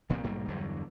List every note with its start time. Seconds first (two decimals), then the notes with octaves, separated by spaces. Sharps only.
0.09 C2 A#2 F3 C4
0.23 B1 G#2 G3 A#3
0.48 E2 G2 D3 F#3